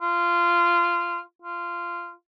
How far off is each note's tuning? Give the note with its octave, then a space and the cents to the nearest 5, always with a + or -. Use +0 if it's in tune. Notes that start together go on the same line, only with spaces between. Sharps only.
F4 -15
F4 -15